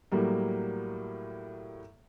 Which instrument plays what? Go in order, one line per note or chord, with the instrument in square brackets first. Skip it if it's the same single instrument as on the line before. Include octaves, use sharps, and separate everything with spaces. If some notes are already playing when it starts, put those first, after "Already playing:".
[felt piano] A2 F#3 G3 A#3